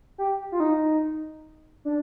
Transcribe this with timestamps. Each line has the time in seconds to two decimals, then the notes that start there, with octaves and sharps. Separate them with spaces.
0.18 G4
0.52 F4
0.60 D#4
1.85 D4